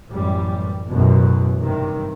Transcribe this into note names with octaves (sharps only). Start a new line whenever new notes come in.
A1 F#2 G3
A1 F#2 B2
G2 C3 D#3